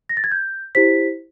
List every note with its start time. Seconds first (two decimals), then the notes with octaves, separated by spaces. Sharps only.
0.09 A#6
0.17 A6
0.24 G#6
0.32 G6
0.75 E4 G4 C5 B6